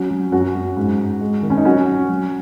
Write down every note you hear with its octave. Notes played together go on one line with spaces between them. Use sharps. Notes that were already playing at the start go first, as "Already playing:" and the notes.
Already playing: F#3 C#4 F#4
F#3
F#2 C#4 F#4
F#2
G#2
G#2
G#3
D#3
C#4
D#4
F#3 C#4 F#4
F#3
F#3